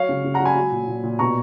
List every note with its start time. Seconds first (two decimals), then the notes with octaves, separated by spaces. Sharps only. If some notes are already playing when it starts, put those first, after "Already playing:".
Already playing: F#3 C#5 F5
0.09 C#3
0.24 C#3
0.34 F#5 A#5
0.39 F#3
0.45 G#5 B5
0.56 F#3
0.72 A#2
0.88 A#2
1.03 A#2
1.19 B2 A#5 C#6